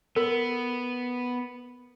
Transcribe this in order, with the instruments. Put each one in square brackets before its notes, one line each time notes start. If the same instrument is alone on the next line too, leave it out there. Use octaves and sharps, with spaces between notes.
[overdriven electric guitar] B3 [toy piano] A#4